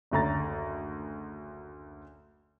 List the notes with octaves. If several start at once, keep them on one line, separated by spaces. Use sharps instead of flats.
F#1 D2 A#5 A6